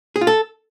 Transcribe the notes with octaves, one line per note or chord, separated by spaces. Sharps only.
G#4
F4
A4